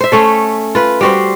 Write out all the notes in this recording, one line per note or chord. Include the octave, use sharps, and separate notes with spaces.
C5 E5
A3 C#4 A4
F4 B4
G3 F#4 C5